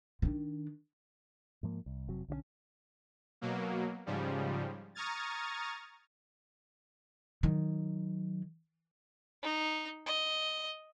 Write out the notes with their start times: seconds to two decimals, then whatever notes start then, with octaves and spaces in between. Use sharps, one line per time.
0.22 D#3 D4
1.63 G#2 F3 A#3
1.86 C2
2.08 F1 C3 F#3
2.28 B1 D3 E3 C#4
3.41 B2 F#3 A#3
4.06 G#2 C#3 F3 G3
4.95 A#5 C#6 D#6 F6 G#6 A6
7.43 D#3 F#3
9.43 D#4
10.06 D#5